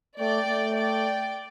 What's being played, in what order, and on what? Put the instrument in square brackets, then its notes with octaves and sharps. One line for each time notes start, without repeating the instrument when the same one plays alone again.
[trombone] A3 [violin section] D5 G5
[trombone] A3
[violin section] D5 G5